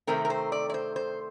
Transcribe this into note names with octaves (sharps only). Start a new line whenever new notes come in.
C3 D#3 A3 C4 A#4
A#4
C5
D5
D5
C5
C5